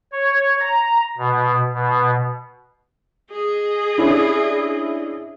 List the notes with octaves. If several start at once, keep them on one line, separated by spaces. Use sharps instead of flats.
C#5
A#5
B2
B2
G#4 D#5
C#4 D4 E4